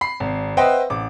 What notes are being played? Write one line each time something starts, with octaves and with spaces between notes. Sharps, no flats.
B5 C7
G#1
B4 C5 D#5 E5 F#5 G5
A1 D6